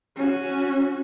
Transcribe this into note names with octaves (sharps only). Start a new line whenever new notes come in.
C#4 F#4